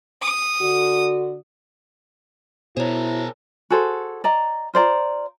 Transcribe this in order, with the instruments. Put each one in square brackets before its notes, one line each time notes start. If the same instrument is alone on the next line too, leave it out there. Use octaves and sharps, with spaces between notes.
[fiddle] D#6
[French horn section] D3 F#4
[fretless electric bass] B2 [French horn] E4 [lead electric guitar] G#4 A#4 [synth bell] C5 C#5
[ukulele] F#4 G#4 A4 C5
D5 D#5 A#5
F4 C5 D5 A#5